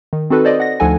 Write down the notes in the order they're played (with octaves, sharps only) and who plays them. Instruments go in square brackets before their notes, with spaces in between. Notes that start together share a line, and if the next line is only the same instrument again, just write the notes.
[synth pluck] D#3
C4 D#4 F#4 A4 B4
A4 C5 D5 D#5
F#5 A#6
D2 F3 D#4 A4 F#5 G#5